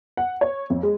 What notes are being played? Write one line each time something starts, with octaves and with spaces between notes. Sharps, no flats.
F#5
C#5
F2
G#3